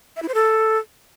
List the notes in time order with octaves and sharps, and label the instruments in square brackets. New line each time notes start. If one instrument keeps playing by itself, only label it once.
[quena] E5
E4
C5
A4